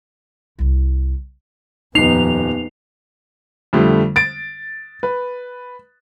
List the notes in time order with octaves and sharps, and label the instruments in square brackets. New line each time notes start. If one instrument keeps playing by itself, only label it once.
[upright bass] C2 E4
[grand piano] D#1 C7 [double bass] F2 B3 [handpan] D#4 [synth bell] F7
[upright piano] F2 D3 G3 A3
A6 D7
B4